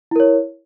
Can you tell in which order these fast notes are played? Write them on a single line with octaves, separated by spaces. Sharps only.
E4 A#4 C#5